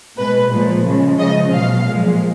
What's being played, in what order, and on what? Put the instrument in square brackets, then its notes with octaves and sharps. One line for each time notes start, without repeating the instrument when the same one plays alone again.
[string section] B2 G#3 B4
A#2 F3 G#3
C#3 F3 G#3
C#3 F3 G#3 D#5
B2 F#3 F5
A#2 F3 G#3